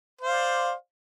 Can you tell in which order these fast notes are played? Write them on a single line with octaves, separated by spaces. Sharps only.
C5 F5 D5